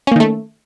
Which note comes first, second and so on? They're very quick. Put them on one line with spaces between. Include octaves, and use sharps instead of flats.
C#4 A#3 D#3 A3